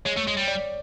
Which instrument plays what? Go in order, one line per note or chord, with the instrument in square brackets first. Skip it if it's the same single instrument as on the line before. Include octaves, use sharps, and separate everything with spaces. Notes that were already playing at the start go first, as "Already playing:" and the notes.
[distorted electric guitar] G#3 [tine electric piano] C#5
[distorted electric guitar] A3
G#3
G3
[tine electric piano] D5